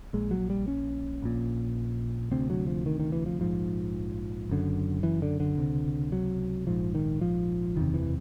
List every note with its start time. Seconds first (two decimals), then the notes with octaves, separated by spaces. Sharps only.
0.13 A#1 A#2 G#3
0.31 F#3
0.50 G3
0.68 C#4
1.22 A#1 A#2
2.31 D2 C3 C4
2.50 F#3
2.67 F3
2.86 D#3
3.00 D#3
3.12 E3
3.26 F3
3.40 A#1 G#2 F3
4.50 F#1 F#2 D3
5.03 E3
5.22 D3
5.40 D3
5.58 C#2 C3
6.12 F#3
6.67 A#1 G#2 F3
6.95 D#3
7.21 F3
7.76 F#1 E2 C3 D#3
7.94 E3